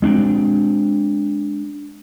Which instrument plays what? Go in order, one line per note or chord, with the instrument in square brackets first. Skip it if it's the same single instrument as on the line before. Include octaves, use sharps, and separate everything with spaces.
[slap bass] G#3 C4 D4